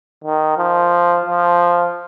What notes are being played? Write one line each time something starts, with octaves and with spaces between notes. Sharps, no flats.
D#3
F3
F3